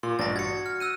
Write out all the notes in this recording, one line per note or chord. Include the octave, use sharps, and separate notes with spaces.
A#2 C6
A1 G2 D5 A6 A#6
F#4 G#6 C#7
F6
E6 F#6 D#7